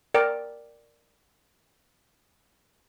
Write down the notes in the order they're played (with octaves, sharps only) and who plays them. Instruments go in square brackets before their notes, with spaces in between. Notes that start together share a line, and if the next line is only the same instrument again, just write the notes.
[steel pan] A#4 D5 G5